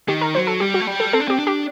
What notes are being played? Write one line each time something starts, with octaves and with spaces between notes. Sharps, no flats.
D#3 G4
A#4
F#3 C5
A4
G3 G4
F#4
A3
G3
A4
C4 A4
D4
C4 G4
D4
G4